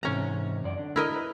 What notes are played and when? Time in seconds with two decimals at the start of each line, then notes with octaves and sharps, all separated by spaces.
0.03 G#2 C3 E3 C#4 A#5
0.64 F#2 D5
0.78 D3
0.96 E4 A#4 D#5
1.16 B4